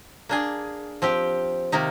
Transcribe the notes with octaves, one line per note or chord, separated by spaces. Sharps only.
A#3 D4 G#4
F3 C4 G4
C3 D#3 A#3 D#4